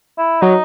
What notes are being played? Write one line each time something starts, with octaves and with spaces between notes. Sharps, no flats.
E4
F#3 D#4